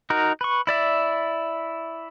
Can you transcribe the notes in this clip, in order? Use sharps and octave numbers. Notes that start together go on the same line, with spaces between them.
D#4 F#4 A#4
B4 C#6
E4 D5 E5